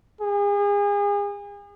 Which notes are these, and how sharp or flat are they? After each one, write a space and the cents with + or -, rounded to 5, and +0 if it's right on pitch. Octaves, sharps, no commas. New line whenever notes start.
G#4 -35